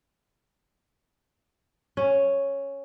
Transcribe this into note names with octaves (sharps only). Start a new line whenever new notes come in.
C#4